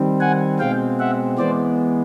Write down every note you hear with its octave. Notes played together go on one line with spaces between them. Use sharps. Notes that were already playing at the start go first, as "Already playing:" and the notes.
Already playing: D#3 G3 C4
F#5 G#5
B2 G#3 C4 F5 G5
E5 F#5
E3 G#3 B3 C5 D5